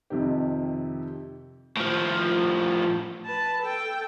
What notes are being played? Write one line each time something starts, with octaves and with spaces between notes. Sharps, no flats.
F2 C3 D#3 G4
A2 F3
B4 A5
A4 G5